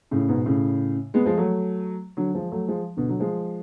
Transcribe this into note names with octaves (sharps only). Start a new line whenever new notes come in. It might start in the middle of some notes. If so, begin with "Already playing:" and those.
A2 C#3
G#2 B2
A2 C#3
G#3 B3
F3 G#3
F#3 A3
D3 F#3
F3 G#3
F#3 A3
F3 G#3
B2 D3
D3 F#3
F3 G#3